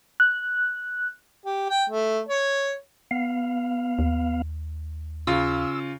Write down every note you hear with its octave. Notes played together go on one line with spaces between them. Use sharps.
F#6
G4
G5
A3
C#5
B3 F5
D#2
C#3 F4 E6